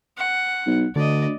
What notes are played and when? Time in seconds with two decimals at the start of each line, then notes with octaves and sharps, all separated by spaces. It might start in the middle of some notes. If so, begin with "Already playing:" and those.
0.18 F#5
0.67 B1
0.96 D2 D3 D5 D#5